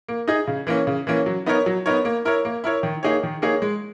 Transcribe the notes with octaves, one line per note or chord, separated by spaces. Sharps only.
A#3
D#4 G#4 D#5
C#3
E3 A#3 C#4
C#3
E3 A#3 C#4
F#3
B3 D#4 A#4 C#5
F#3
B3 D#4 A#4 C#5
A#3
E4 A#4 C#5
A#3
E4 A#4 C#5
D#3
A#3 D#4 G#4 C#5
D#3
A#3 D#4 G#4 C#5
G#3